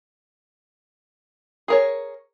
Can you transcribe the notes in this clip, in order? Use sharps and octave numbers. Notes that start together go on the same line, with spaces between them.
G#4 A#4 C#5